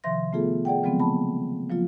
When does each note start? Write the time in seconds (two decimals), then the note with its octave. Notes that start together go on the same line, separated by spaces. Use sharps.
0.04 C3 D#3 F3 E5 C6 A#6
0.33 A3 B3 F4 G#4 A4
0.65 G#4 D5 F#5 G5
0.83 C#3 F3 F#3 G#3 B3 C4
1.00 A#3 A5 B5
1.70 F3 F#3 A#3 F4